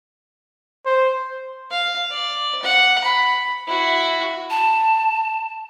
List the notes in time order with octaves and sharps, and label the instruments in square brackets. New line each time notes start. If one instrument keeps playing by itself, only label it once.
[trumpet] C5
[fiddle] F5
D5
F#5
B5
E4 F#4
[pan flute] A5